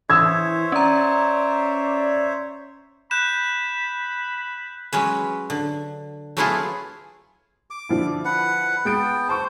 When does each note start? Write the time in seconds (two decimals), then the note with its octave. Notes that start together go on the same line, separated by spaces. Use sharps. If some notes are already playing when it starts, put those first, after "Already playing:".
0.10 E3 C5 C#5 E5 D#6 E6 G#6
0.72 C#4 D5 A#5
3.11 B5 F#6 G6 E7
4.93 F#3 G#3 C#4 B4
5.50 D3
6.37 F#3 A3 B3 E4 F4 G#4
7.70 D6
7.89 D3 F3 E4
8.25 B4 F#5
8.85 G#3 B3 G5 A6 D7
9.29 C5 A5 C#6